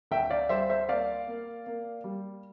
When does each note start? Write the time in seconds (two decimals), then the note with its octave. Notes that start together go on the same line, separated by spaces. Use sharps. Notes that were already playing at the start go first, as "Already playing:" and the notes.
0.11 D2 E5 G5
0.30 D5 F5
0.49 G3 C5 E5
0.70 C5 E5
0.88 A#3 D5 F5
1.27 A#3
1.67 A#3
2.04 G3